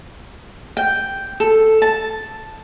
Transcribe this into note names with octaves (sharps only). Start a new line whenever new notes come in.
G5
A4
A5